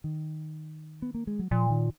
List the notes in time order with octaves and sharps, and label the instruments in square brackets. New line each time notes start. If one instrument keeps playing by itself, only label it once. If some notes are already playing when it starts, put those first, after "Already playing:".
[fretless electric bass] D#3
B3
A#3
G#3
F#3
[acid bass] A#2 [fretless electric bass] F3
[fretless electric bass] D#3